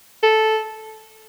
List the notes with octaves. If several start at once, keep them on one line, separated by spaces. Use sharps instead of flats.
A4